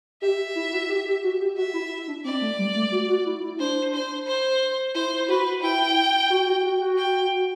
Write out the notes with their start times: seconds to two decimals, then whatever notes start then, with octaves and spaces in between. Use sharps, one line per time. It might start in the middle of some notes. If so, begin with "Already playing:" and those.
0.22 G4 E5
0.55 E4
0.72 F#4
0.89 G4
1.06 G4
1.23 F#4
1.40 G4
1.57 F#4 E5
1.73 E4
2.08 D4
2.24 C4 D5
2.41 A3
2.58 G3
2.75 A3
2.92 F#4
3.09 F#4
3.26 E4
3.43 E4
3.59 D4 C5
3.93 C5
4.27 C5
4.94 E4 C5
5.28 F#4 B4
5.62 E4 G5
6.30 F#4
6.46 F#4
6.63 F#4
6.80 F#4
6.97 G5